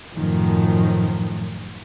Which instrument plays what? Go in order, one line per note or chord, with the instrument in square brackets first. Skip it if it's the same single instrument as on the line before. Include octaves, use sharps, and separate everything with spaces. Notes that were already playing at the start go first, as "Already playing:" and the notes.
[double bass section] F#2 A2 D#3 F3